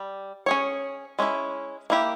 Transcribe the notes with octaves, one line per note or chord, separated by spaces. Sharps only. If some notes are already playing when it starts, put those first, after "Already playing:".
Already playing: G3
C#4 G#4 C#5
G#3 C#4 E4
A#3 E4 G4